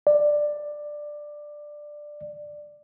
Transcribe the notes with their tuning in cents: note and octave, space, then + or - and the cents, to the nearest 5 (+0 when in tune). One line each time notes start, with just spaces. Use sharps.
D5 +10